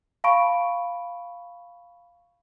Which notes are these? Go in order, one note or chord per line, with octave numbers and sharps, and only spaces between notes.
F5 A5 B5 C#6 D7